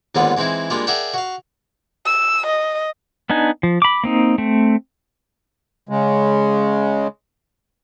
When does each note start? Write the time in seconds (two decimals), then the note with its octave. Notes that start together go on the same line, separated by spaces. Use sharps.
0.15 D#2 G#2 D3 G3 B3 F4
0.37 E3 G#3 C4 D#4 E4
0.70 G3 G#3 A#3 D4 F4
0.87 G#4 A#4 D5 E5 F#5 G5
1.14 F#4 F5
2.06 E6
2.47 D#5
3.30 B3 D4 D#4 G#5
3.63 F3
3.82 B5 D6
4.04 A#3 C4 D#4
4.38 A3 C4
5.89 C#3 G#3